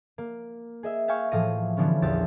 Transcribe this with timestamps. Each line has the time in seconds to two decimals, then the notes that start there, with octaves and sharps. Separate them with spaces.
0.18 A#3
0.83 G#4 D#5 E5
1.08 E5 F5 G5 G#5 C#6
1.32 A2 E3 F3 F5 A#6 D#7
1.77 D3 E3 F3 G3 B3 C#4
2.02 A#1 E2 G4 E6 A6